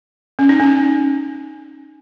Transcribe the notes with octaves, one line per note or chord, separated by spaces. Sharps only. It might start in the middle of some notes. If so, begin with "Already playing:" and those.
C#4
D#4
C#4